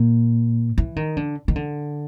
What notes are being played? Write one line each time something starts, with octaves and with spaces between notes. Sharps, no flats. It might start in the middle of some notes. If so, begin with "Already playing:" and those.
Already playing: A#2
E3
D#3
D3
D#3
D3